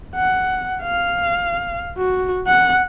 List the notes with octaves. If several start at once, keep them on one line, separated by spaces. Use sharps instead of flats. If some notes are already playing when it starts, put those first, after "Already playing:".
F#5
F5
F#4
F#5